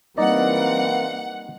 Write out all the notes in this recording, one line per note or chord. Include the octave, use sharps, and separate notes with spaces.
E3 G3 A#3 C4 D#4 D5 D#5 F#5